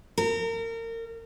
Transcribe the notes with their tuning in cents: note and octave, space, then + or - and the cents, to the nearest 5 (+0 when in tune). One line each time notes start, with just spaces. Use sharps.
A#4 -30